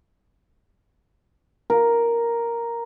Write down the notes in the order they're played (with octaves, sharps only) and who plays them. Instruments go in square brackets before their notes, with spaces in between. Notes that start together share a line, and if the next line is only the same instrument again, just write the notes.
[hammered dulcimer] A#4